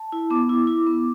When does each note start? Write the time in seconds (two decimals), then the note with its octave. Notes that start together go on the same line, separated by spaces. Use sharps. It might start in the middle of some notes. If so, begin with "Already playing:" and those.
Already playing: A5
0.12 E4
0.30 B3 D6
0.49 E4
0.67 E4
0.87 B3